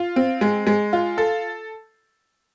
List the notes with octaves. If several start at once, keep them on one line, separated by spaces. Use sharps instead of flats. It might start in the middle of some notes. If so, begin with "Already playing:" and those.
Already playing: F4
C4
G#3
G#3
F4
A4